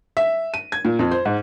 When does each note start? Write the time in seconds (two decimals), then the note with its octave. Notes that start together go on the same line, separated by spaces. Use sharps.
0.17 E5
0.54 D#7
0.72 G#6
0.85 A#2
0.99 F2
1.11 C5
1.25 G#2